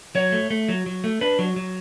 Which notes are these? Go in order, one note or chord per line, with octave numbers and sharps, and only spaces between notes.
F#3 C#5
A3
A3
F#3
F#3
A3
D4 B4
F#3
F#3